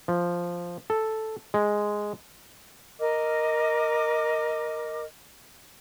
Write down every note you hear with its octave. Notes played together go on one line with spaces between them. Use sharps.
F3
A4
G#3
A#4 D#5 D6 F6